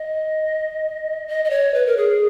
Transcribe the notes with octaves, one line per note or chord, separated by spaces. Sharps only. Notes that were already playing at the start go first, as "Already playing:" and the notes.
Already playing: D#5
D#5
D#5
C#5
B4
A#4
G#4